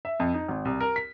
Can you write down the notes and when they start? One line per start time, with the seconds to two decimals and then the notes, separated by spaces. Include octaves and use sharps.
0.05 E5
0.20 F2
0.34 D#4
0.48 G#1
0.65 C2
0.81 A#4
0.96 B6